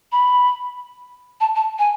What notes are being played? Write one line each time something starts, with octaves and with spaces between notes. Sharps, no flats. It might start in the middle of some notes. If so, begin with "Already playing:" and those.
B5
A5
A5
G#5